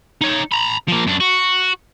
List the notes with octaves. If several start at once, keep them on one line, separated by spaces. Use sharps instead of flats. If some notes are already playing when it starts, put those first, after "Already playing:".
D#4 C#5
A#5 B5
F3 A#3
F#2 D4
F#4